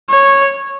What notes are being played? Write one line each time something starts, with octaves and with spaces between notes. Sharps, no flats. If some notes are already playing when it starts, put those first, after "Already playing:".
C#5